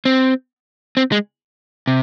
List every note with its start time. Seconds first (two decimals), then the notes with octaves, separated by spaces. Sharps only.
0.05 C4
0.97 C4
1.12 G#3
1.87 C3